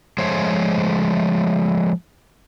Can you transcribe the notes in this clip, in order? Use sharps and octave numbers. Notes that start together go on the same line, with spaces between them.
F3 G#3 A3 C5 C#5